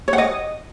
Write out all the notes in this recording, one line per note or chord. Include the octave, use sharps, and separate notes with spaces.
C#5
F#5
D#5